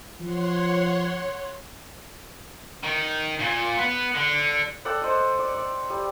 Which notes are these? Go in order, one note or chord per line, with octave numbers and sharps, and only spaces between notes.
F3 C#5 F#5 C6
D#3
A#2
B3 B4
D3
A4 D5 F#5 G5
C5 D#5
D5
D5
G3